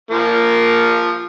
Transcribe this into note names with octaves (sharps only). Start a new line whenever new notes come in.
F3 A#3